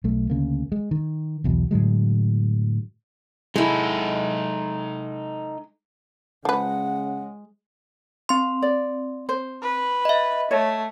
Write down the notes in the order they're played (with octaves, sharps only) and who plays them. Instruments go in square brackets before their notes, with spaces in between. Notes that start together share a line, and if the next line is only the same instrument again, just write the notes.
[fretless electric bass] B1 A3
D2 C#3 A#3
G#3
D#3
B1 E2 B2
A2 D3 F#3 G#3
[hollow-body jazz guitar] G#3 E4 [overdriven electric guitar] D#4 A4
[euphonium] C#3 [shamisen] F3 B4 [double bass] G#3 [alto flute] F#5
[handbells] C4 C6
[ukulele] D5
C5
[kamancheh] B4
[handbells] D#5 E5
[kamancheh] A3 [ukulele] C#5